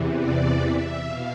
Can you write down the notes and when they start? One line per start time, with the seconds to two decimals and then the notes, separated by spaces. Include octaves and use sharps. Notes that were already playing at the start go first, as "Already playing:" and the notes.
Already playing: E2 C3 E3
0.13 D5
0.59 E5
1.04 B2 F5